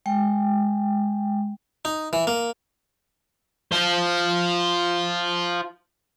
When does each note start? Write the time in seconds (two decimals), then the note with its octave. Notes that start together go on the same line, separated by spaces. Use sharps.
0.06 G#3 G5
1.85 D#4
2.13 E3
2.27 A#3
3.72 F4 C5